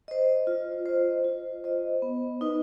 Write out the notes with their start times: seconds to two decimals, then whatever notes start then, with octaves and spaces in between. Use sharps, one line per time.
0.08 C5 D#5
0.47 F4
0.86 C5 D#5
1.25 F4
1.64 C5 D#5
2.02 B3
2.41 D#4 B4 D#5